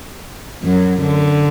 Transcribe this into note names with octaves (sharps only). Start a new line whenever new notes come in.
F#2 F#3
D3